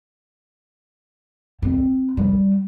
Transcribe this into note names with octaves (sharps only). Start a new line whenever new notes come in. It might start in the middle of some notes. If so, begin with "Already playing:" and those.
C4
G3